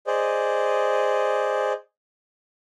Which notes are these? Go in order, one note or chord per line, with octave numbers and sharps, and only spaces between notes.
G#4 C5 D5 D#5